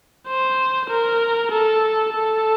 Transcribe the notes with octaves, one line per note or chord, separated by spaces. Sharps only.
C5
A#4
A4
A4